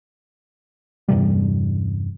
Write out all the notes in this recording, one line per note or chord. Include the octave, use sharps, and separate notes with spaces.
E2 G2 C3 G3